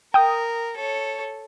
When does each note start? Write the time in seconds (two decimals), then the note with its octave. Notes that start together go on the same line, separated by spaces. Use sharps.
0.14 A#4 G5 D#6
0.76 A4 C#5